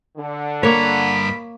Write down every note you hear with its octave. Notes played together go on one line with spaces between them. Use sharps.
D3
G2 A#3 C#5 A#5 B5